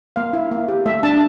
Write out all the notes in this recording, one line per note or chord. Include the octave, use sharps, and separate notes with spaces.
A#3 F5
E4
A#3
G4
A3 E5
D4 A5